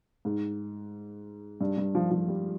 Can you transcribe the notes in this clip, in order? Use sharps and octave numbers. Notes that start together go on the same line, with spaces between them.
G#2
G2
G2
F3
F3
G3